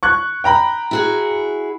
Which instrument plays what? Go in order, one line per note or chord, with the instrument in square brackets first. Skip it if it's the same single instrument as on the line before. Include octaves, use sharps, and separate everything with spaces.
[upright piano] C#6 F#6 G#6
G5 A#5 B5
[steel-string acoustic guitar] E4 F#4 G#4